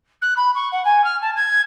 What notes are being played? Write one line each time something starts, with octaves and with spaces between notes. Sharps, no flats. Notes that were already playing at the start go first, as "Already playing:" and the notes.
F#6
B5
C#6
F#5
G#5
F6
A5
G#6